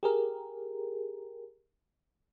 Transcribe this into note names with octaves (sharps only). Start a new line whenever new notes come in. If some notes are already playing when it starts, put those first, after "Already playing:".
G4 G#4 A#4